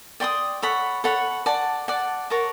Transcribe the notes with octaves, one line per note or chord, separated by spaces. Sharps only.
D5 G5 C6 D#6
A4 C#5 F#5 B5
A4 C#5 F#5 B5
D5 F#5 A5
D5 F#5 A5
A#4 C#5 F#5 A5